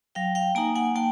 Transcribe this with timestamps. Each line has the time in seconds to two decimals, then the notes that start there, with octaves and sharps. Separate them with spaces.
0.15 F#3 F5 G5
0.35 F5 G5
0.55 A#3 D#4 G#5 A#5
0.76 F#5 G#5
0.96 A#3 G5 A5